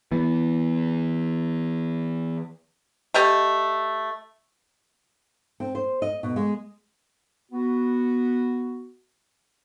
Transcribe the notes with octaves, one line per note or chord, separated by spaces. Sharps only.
E3 B3
A3 G4 D#5
C4
C5
D#5
B2
G#3
B3 F#4